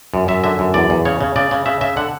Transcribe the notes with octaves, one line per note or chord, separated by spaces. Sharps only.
F#2
F#2 E5
D3 E5
F#2
E2 D5
E2
C#3 C#5
C#3
C#3 D5
C#3
C#3 E5
C#3 E5
D3 F#5